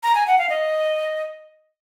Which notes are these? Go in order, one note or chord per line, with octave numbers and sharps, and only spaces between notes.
A#5
G#5
F#5
F5
D#5